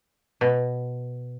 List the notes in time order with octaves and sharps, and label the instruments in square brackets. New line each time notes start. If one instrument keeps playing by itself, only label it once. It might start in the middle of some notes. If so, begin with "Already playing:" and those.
[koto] B2